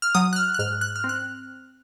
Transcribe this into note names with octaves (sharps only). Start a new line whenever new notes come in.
F6
F#3 D#6
F#6
F6
F#6
G#2 F6
F#6
F6
C4
F#6